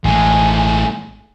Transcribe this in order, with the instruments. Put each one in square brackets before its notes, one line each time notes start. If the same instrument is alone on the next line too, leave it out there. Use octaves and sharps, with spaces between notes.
[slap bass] A1 [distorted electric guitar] A2 G#3 [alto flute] G#5